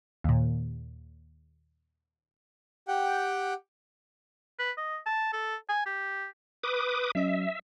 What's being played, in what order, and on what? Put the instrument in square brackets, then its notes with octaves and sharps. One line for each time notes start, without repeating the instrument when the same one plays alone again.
[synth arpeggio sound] D#2 A#2
[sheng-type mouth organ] G4 F#5 G5
[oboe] B4
D#5
A5
A4
G#5
G4
[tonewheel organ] B4 D6 D#6
[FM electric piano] F#3 C#4 D#5 [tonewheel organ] E5